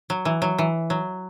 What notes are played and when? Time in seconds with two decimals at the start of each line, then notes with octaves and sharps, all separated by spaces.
0.10 F#3
0.25 E3
0.42 F#3
0.58 E3
0.90 F#3